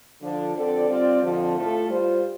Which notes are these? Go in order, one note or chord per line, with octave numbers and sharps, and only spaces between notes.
D3 F3 D4
D3 F3 C4 A4 D5
G3 C4 F4 D5
F2 D3 F3
A2 A3 F4 A4
G3 F4 C5